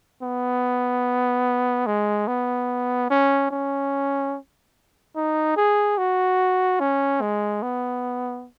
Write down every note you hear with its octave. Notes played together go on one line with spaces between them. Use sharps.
B3
G#3
B3
C#4
C#4
D#4
G#4
F#4
C#4
G#3
B3